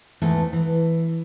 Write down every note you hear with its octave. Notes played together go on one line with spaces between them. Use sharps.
E2 G#2 E3 A3
E3